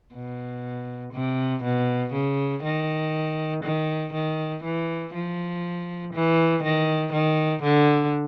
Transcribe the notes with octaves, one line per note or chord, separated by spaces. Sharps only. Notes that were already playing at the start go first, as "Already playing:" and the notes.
B2
C3
B2
C#3
D#3
D#3
D#3
E3
F3
E3
D#3
D#3
D3